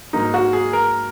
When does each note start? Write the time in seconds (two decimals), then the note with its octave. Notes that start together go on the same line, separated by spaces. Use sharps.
0.13 G#2 F#3 A#3 D#4
0.34 F#4
0.53 G#4
0.73 A#4